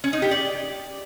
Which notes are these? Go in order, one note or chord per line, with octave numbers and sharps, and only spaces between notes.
C#4
D#4
G4
D5